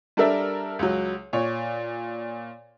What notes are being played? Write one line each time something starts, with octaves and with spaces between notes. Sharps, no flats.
G3 D4 A4 A#4 E5
C#2 F#3
A#2 C#5